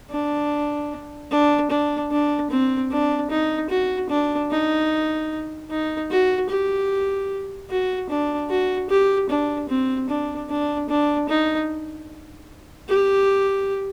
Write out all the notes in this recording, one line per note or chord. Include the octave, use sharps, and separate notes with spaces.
D4
D4
D4
D4
C4
D4
D#4
F#4
D4
D#4
D#4
F#4
G4
F#4
D4
F#4
G4
D4
C4
D4
D4
D4
D#4
G4